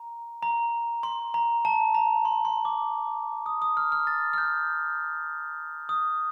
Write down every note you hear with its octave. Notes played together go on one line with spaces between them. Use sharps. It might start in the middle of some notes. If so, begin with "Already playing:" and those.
Already playing: A#5
A#5
C6
A#5
A5
A#5
C6
C6
D6
D#6
D#6
F6
F6
A6
F6
G6
D#6